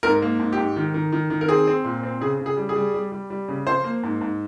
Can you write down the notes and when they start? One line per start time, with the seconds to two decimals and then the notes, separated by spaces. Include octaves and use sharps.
0.03 G#2 A#4
0.22 A#3
0.39 G#2
0.53 G#2 G4
0.76 D#3
0.94 D#3
1.12 D#3
1.30 D#3
1.41 A#4
1.48 C4 G#4
1.67 C4
1.84 A#2
2.03 C4
2.21 C#3 G#4
2.39 C#3
2.46 G#4
2.57 G3
2.69 G#4
2.76 G3
2.94 G3
3.12 G3
3.30 G3
3.48 C#3
3.67 F3 C5
3.84 A#3
4.03 G#2
4.21 G#2